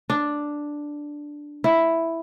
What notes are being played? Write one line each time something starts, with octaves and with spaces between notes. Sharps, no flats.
D4
E4